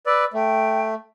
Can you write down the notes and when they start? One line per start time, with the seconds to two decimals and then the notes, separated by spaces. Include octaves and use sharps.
0.06 B4 D5 E6
0.34 A3 G5